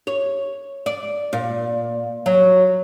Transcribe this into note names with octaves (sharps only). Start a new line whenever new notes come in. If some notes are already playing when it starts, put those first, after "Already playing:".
C#5
D5
A#2
F#3